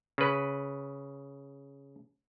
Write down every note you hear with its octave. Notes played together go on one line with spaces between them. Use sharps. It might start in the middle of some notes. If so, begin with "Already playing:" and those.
C#3 B4